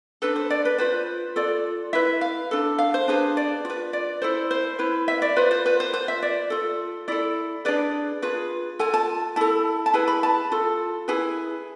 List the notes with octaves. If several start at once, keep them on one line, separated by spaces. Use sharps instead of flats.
D4 A4 B4
C5
D5
B4
F4 B4 C5
F4 A4 D5
E4 B4 E5
F5
D4 A4
F5
C5
D4 G#4 B4
D5
F4 B4
D5
E4 A4 C5
C5
E4 B4
E5
D5
F4 B4 C5
C5
B4
C5
F4 B4 C5
E5
D5
F4 A4
E4 A4 D5
D4 G#4 B4 D5
F4 G#4 B4
F4 A4 G#5
A5
E4 A4 A5
A5
E4 G#4 B4 G#5
B5
A5
F4 A4
E4 G#4 B4 G#5